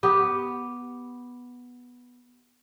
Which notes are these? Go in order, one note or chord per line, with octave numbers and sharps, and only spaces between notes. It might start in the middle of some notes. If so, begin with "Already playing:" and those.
B3 G4